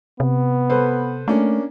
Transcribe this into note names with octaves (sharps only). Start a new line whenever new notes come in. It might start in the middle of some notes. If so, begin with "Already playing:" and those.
C3 B3
A4 B4 C5
A3 A#3 C#4 D4